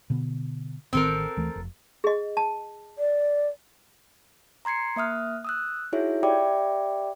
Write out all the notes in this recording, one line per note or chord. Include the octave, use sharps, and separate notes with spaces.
B2 D3 B3
A1 D#3 C4 A4 A#4
D2 E3 A3
F1
G#4 D#5
A5
D5
A#5 C6 G#6 C7 C#7
A#3 E5 D#6 F6 F#6
D#6 E6 F#6
D#4 E4 F#4 G#4 C#5 E5
G4 D5 E5 G5 B5 D6